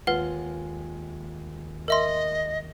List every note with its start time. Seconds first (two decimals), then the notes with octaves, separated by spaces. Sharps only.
0.07 D#2 G#3 F4 B4 F#5
1.88 A#4 D#5 E5 C6